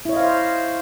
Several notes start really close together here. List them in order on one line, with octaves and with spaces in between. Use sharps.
E4 C#5 D#5 F5 C5